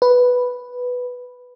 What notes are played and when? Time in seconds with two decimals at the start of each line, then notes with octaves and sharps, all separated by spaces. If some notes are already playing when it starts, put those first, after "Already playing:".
0.02 B4